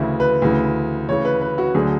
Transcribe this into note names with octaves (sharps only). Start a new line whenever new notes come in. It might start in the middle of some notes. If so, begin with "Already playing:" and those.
Already playing: D2 C#3 E3 E5
B4
D2 C#3 E3
D2 C#3 E3 C#5
B4
B4
F#4
D2 D3 F#3 G#4